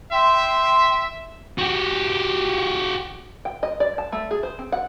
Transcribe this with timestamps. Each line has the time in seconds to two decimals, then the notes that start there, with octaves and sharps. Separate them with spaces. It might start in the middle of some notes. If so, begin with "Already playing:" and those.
0.12 E5 G5 C6
1.58 F#4 G4
3.45 G5
3.63 D#5
3.80 D5
3.98 A5
4.12 A3
4.31 G#4
4.43 C5
4.59 C4
4.72 F#5